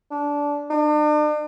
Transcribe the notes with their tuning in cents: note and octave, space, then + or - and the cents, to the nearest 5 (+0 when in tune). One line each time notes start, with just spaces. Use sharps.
D4 -15
D4 +40